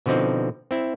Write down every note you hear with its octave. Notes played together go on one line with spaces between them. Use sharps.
B2 D3 F3 C4 D#4
C4 E4